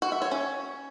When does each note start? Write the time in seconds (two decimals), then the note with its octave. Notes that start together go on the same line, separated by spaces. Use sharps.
0.02 F#4
0.12 E5
0.22 C#5
0.31 C#4